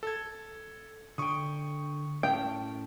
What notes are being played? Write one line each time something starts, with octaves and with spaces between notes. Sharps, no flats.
A4 G#6
D3 G5 C#6 D#6
A2 C#4 G5 A5